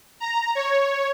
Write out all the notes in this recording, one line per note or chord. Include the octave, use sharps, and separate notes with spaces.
A#5
C#5